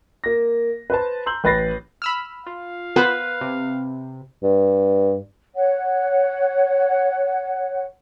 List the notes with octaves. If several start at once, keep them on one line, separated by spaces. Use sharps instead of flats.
A#3 A#6
B4 C5 A5
A#5 C6 E6 G6 F#7
A1 B4 B5 A6 A#6 C7
B5 E6 F6
F4 F5
B3 B4 C5
C3
G2
C#5 F#5